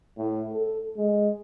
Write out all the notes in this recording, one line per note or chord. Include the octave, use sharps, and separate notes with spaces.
A2
A4
G#3